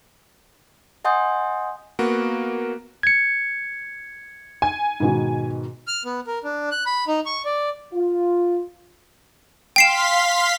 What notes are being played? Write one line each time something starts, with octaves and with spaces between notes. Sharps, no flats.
D#5 F#5 G#5 C6 D#6 G6
A#3 B3 F#4
G#6 C#7
G#5
G#2 B2 D#3
F6
B3
A#4
D4
F#6
B5
D#4
C#6
D5
F4
F5 G5 C6 B6 C7 E7